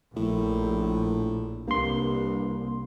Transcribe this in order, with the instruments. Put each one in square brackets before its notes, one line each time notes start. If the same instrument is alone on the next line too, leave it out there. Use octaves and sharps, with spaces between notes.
[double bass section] A#1 [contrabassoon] A2
[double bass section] C2 [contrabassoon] G2 [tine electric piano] A#3 C6